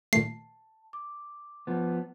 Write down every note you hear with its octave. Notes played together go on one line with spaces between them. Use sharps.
A#2 D#3 A3 A5 C7
D6
F3 B3